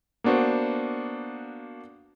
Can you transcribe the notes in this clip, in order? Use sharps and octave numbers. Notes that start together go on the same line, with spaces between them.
A#3 B3 D4 F#4 C5